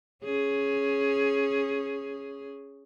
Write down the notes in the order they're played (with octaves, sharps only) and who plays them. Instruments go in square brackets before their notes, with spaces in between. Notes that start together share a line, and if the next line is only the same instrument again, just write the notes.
[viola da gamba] C#4 G#4